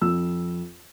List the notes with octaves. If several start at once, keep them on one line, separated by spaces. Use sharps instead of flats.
F2 E6